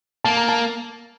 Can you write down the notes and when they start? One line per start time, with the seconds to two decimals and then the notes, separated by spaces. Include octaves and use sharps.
0.25 A#3 A5
0.37 A#5
0.49 A5